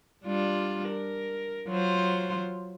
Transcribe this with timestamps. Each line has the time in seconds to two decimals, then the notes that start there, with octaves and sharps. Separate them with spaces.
0.24 G3 D4 F4
0.89 A#4
1.68 F#3 F4 C5